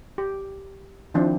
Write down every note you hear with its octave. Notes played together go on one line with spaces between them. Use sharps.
G4
D#3 F3 C4 D4 E4